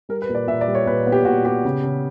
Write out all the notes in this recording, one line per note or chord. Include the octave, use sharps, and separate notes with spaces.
G3 A#4
B4
A#2
D5
A#2 E5
D5
G3
C#5
A#2 B4
B3
G4
A#2 F#4
B3 G4
C#3
C#3